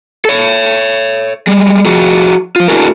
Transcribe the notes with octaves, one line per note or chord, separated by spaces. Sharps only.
A4 C#5
G3 G#3
F3 F#4 G#4
F3 F4
A3 D4 E4 F#4 G#4 A#4